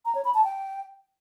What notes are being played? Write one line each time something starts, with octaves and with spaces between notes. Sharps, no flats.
A#5
C#5
B5
A5
G5